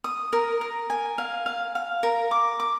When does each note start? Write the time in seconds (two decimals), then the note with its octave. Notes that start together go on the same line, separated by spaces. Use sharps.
0.04 D#6
0.33 A#4
0.61 A#4
0.90 G#5
1.18 F5
1.46 F5
1.75 F5
2.03 A#4
2.31 D6
2.60 D6